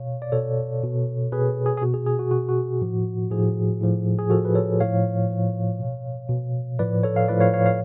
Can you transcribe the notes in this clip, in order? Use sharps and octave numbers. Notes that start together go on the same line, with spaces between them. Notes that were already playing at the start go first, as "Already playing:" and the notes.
Already playing: B2 C#5 F5
D5
B2 A4 C#5
B2
B2 G#4 B4
G#4
G#4
B2 F#4
G#4
G#4
F#4
B2 F#4
F#4
A2 F3
A2 F3 G#4
A2 F3
G#4
A2 F3 F#4 A4
B4
A4 C#5
A2 F3 C#5 F5
A2 F3
B2
B2
A2 F3 B4 D5
A4 C#5
F5
A2 F3 B4 D5
C#5 F5
C#5 F5
C#5 F5